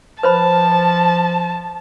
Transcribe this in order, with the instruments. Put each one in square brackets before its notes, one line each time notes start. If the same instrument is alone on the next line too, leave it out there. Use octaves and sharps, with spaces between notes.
[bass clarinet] F3 [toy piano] B4 C5 B5 [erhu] A5